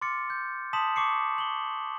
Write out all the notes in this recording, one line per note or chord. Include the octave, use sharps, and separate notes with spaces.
C6 D6 F6 A6 C#7
G6
A5 C6 D#6 B6 E7 F#7
C#6 D6 C7 C#7
F#7 G7